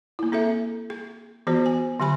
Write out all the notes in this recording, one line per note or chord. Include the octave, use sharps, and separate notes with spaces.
A#3 E4
C4 G#4 A4 E5
G#4
E3 B3 F#4 G#4 C5
G#5
D3 F#3 G4 G#5 B5